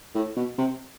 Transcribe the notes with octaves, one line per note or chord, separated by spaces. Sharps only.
A2
B2
C3